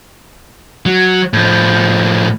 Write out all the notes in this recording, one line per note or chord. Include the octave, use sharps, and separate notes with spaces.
F#3
A2 F3